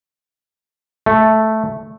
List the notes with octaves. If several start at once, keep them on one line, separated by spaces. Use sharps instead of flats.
A3